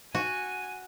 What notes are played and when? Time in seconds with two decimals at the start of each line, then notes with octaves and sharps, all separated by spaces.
0.15 F#4 G#5